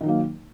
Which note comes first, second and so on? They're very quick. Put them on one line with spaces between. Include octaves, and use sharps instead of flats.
D#3 D#4 F#3 A#3